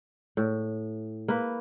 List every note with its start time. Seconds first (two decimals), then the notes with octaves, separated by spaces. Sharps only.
0.37 A2
1.28 A#3 B4